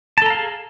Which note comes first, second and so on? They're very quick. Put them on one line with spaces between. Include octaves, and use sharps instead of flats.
A5 A4 A#5 F5 G#4